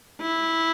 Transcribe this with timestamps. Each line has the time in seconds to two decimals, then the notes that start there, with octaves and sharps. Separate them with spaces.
0.21 E4